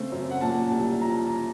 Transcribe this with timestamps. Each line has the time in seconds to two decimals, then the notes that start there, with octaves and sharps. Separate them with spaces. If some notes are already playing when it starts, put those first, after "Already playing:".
Already playing: C#3 A3 C4
0.12 F#2
0.31 F#5
0.41 A#2 A5
0.71 C2
1.01 F3 A#5